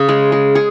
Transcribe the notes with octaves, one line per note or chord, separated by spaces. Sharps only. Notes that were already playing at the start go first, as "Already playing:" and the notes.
Already playing: C#3 G#4
G#3
G#3
G#4